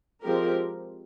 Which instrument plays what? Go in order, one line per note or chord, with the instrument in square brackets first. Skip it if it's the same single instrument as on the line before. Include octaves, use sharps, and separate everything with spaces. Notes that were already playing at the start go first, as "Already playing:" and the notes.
[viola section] F3 G#3 C4 G4 A#4